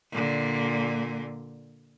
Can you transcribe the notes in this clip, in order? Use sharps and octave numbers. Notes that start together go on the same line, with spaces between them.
A#2 D3